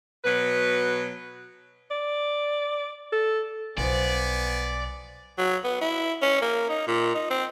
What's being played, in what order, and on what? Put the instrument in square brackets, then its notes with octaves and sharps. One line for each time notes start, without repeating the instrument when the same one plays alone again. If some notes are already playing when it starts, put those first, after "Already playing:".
[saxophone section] B2 F#3 B4
[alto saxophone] D5
A4
[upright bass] B1 [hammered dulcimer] F3 [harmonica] B3 G#5 [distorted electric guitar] D5
[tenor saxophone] F#3
B3
E4
C#4
A#3
D#4
A#2
D#4
C4